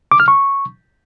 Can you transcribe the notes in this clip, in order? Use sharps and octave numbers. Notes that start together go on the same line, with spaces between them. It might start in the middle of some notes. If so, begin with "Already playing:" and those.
D6
F6
C#6